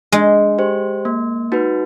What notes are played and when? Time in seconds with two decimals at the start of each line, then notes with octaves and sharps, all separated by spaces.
0.12 G#3 D4
0.58 G4 C5
1.05 A#3
1.52 D#4 F#4 B4